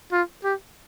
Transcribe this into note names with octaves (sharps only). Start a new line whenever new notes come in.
F4
G4